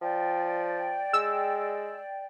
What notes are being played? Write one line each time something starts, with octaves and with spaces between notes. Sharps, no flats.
F3 D5 G5
G#3 E6